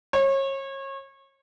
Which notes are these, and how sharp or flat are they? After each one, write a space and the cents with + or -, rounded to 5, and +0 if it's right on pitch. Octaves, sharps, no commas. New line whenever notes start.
C#5 -30